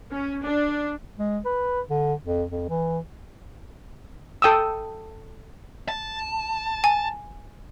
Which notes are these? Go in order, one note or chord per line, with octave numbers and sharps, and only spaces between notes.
C#4
D4
G#3
B4
D3
F2
F2
E3
A4 G5 D#6 E6
A5
G#5